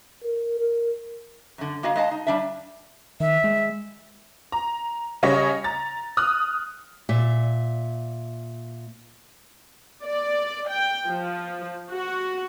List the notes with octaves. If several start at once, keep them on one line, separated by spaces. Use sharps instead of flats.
A#4
A#4
F#2 D3
A#3 F#4 D#5 F5
G#3 D#5 F5 A5
D#4
G3 D4 E5
D#3 E5
G#3
A#5
C#3 G3 C#5 D#5 A#6
A#5 A6
D#6 F6 F#6
A#2 E5
D5
G5
F3
F#4